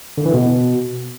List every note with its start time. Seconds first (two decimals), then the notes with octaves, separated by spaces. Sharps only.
0.18 D3
0.26 E3
0.34 B2